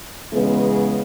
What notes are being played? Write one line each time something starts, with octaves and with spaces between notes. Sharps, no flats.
C#3 E3 G#3 B3